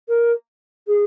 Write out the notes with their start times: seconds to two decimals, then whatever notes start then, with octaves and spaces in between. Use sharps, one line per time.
0.08 A#4
0.87 G#4